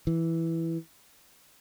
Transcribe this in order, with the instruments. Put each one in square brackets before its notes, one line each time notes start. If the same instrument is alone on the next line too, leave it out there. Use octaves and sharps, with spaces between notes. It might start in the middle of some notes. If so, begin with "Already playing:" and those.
[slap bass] E3